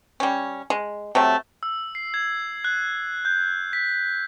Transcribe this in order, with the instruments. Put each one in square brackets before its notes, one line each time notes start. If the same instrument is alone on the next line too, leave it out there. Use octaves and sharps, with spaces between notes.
[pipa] G3 C#4
G#3
C3 F#3 A3
[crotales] E6
C7
G#6
F#6
G6
B6